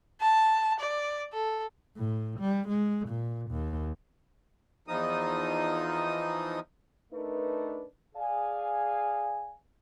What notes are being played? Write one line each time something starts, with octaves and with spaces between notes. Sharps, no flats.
A5
D5
A4
A2
G3
G#3
A#2
D#2
E2 F3 D#4 D#6
A3 D4 D#4 A#4 B4
G#4 D5 F5 G#5